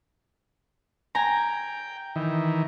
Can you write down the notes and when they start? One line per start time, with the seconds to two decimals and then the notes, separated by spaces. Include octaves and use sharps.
1.15 G5 G#5 A#5
2.16 D#3 E3